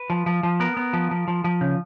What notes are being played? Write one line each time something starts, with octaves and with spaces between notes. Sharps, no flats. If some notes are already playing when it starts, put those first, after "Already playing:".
Already playing: B4
F3
F3
F3
B3 A#4
B3
F3
F3
F3
F3
C#3